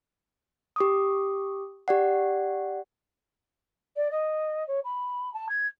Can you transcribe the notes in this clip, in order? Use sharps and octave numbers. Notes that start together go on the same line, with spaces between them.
G4 D6 D#6
G4 D5 F#5
D5
D#5
C#5
B5
A5
G#6